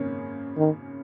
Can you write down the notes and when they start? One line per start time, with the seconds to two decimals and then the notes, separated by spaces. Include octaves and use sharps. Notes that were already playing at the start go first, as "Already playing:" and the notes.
Already playing: G#1 F#2 C#3 A#3 C#4
0.57 D#3